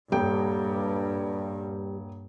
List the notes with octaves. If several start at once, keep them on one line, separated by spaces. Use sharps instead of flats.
D#1 G2 G3 G5